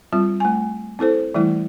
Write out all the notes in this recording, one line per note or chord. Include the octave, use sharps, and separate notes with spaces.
G3 C4 F4
A3 G#5
C4 E4 A4 C5
E3 G3 A3 E4